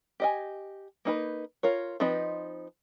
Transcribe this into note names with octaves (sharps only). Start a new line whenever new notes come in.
G4 D#5 G#5
A#3 D#4 B4
F4 A#4 C#5
F3 C4 D#4 B4 D#5